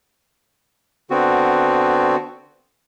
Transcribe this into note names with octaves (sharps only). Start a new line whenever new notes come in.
D3 B3 C4 F#4